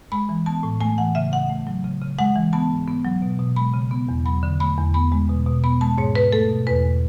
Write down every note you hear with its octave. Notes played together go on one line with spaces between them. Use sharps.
G#3 B5
E3
B3 A5
A2
A3 G#5
E3 F#5
C#3 E5
C#3 F#5
A3
F#3
C#3
C#3
G#3 F#5
E3
B3 A5
G#2
B3
F#3
B2
B2
G#3 B5
C#3
B3
E2
F#3 B5
D3
A3 B5
E2
B3 B5
G#3
B2
B2
B3 B5
G#3 A5
G#2 C#5
G#2 B4
A3 A4
B2
E2 B4